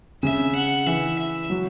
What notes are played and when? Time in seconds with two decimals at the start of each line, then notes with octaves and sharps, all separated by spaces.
0.23 C#3 E5
0.55 F#5
0.87 E3 E5
1.19 E5
1.50 F#3